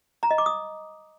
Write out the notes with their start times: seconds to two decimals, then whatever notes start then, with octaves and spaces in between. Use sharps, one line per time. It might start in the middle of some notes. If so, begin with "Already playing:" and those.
0.23 A#5
0.31 D#5
0.38 D6
0.46 D#6